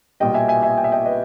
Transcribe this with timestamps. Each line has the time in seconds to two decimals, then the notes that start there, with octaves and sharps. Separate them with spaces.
0.20 B1 A#2 G3 D#5 G5
0.34 E5 G#5
0.48 E5 G#5
0.62 E5 G#5
0.77 G5
0.84 E5
0.92 D#5 G5
1.05 B4 D#5